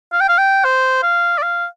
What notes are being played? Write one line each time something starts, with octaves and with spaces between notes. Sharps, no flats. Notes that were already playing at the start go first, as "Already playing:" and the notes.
F5
G5
F5
G5
C5
F5
D5
F5